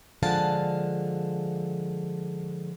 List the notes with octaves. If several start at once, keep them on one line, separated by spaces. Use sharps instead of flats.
D3 F3 G#3 F5 F#5 A5